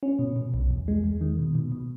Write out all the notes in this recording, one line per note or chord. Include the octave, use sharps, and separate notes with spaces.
C#4
B2
B2
B1
E2
G#3
E2
D#3
B2
B2
B2